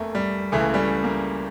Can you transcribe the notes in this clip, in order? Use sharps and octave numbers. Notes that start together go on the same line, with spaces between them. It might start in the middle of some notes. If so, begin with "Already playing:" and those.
Already playing: F1 E2 A3 A#3
G3
C#2 C#3 E3 A3
G3
A3
A#3